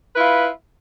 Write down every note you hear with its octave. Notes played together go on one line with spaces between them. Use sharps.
E4 F4 B4